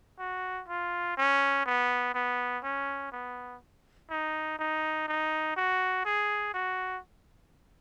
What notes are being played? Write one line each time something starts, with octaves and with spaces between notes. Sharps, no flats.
F#4
F4
C#4
B3
B3
C#4
B3
D#4
D#4
D#4
F#4
G#4
F#4